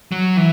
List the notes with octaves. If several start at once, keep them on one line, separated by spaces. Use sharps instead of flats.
F#3
E3